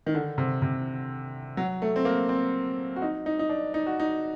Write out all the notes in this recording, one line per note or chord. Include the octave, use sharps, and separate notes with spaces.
D#3
D3
C3
C3
F#3
A3
C4
A#3
C4
F#4
D#4
D#4
D#4
D4
D#4
F#4
D#4